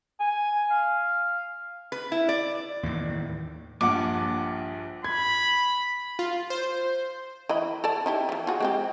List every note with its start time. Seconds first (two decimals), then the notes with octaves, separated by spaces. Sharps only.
0.20 G#5
0.71 F5
1.92 B4
2.12 E4
2.29 D5
2.83 D#2 A2 E3
3.81 A#1 G2 F#5 D6
5.04 B5 G#6
6.19 F4
6.50 C5
7.49 E3 D#5 B5
7.84 A4 D5 A5
8.06 D#4 E4 G4
8.29 E3 F3
8.47 F4 F#4 G#4
8.61 G#3 C4 G4